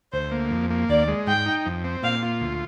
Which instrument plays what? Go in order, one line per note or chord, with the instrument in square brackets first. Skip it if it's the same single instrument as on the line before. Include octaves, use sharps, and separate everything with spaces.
[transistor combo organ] D2 [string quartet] C5
[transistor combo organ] A#3
F2
A#3
[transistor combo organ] D#2 [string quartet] D5
[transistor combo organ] G#3
[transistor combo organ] G#2 [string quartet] G5
[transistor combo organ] D#4
F2
C4
[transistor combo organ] A#2 [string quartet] F5
[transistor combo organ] F4
D2